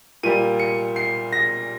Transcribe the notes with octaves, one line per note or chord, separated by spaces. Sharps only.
A#2 G3 A#3 D#7
C#7
C7
A#6